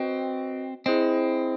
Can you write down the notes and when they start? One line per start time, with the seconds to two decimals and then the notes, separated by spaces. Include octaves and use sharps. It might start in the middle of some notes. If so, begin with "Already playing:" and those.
Already playing: C4 F#4 B4 D#5 G5
0.86 C4 E4 G#4 C5 D#5